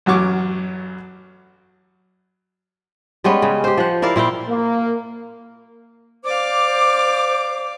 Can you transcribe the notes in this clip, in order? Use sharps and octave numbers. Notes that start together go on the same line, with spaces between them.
A1 F#2 F#3 C#6 D6
G3 G#3 B3 C#4
C#3
G4 C5
F3 F#5
E4 A#4 D5 F5
A#2 E4 F5 G5
A#3
C5 D5 F5 D6